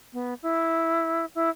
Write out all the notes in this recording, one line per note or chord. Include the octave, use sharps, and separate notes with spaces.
B3
E4
E4